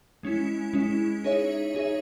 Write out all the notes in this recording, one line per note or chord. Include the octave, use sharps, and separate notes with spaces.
G#3 C#4 E4
G#3 C#4 E4
D#4 G#4 C#5 E5
D#4 G#4 C#5 E5